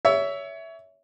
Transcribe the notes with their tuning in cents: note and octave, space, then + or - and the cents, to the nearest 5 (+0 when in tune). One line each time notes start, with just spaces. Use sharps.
C#5 +25 E5 +0